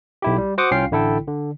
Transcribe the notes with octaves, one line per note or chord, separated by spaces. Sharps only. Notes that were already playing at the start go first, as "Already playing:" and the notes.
B1 E4 G4
G3
F#4 C5 F#5 D6 D#6
C2 C#4 F4 F5 G5 C7
A1 D3 E4 A4 G5
D3